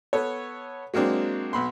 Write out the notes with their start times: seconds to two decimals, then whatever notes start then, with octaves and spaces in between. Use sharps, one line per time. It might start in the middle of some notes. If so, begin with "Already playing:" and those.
0.13 B3 A4 C#5
0.94 F#3 G#3 A#3 C4 D4
1.53 B1 B5 C6